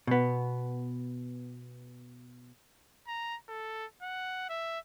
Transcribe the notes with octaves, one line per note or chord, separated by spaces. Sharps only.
B2 B3
A#5
A4
F#5
E5